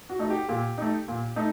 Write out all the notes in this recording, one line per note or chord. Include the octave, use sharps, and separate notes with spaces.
F#4
A3 D#4
G4
A#2 G4
A3 D#4
A#2
A3 D#4